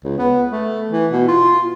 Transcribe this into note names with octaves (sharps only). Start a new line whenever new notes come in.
C#2
B3
A3
E3
B2
F4